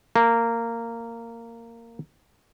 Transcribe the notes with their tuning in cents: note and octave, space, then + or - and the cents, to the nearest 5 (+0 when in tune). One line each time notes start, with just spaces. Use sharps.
A#3 -15